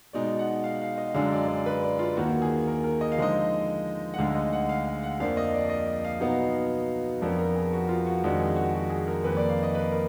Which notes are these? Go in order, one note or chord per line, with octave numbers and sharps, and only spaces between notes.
B2 G#3 D#4 D5
F#5
F5
F5
D#5
F#2 D3 G#3 D4 F5
D5
D5
B4
D5
F4
D#2 D#3 A#3 F#4
G#4
A#4
A#4
D#5
F5
D3 F3 G#3 D#4 D#5
F#5
D2 D3 G#3 D#4 F5
D#5
F#5
F5
F5
F#5
F2 F3 A#3 D4 F5
D#5
D5
D#5
F5
B2 F#3 B3 D#4
F2 F3 B3 D4 A#4
A#4
G#4
F#4
F4
F#4
F2 D#3 G#3 D4 F#4
G#4
F#4
F#4
G#4
A#4
F2 D#3 A#3 B4
D5
F5
D#5
B4
A#4